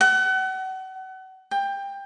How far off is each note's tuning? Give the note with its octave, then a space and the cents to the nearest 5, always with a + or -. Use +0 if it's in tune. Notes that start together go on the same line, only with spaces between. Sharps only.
F#5 +35
G5 +20